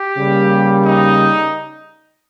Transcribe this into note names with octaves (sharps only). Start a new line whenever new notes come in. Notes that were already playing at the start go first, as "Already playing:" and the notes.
Already playing: G4
C#3 G3 A#3
D#4